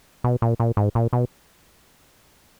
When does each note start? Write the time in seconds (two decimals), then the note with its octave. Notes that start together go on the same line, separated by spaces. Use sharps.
0.24 B2
0.42 A#2
0.60 A#2
0.77 G#2
0.95 A#2
1.13 B2